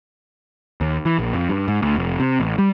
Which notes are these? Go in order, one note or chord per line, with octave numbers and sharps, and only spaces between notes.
D#2
E3
A#1
F2
G2
G#2
D2
F1
C3
A1
G3